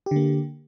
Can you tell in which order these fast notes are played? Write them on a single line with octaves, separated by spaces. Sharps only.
G4 D3 A#3